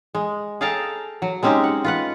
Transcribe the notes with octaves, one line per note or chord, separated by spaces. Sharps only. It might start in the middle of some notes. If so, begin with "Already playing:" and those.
G#3
G#4 A4 F5 G5 A5 A#5
F#3
G#3 C4 C#4 D#4 G4 G#4
F#5
F4 B4 F#5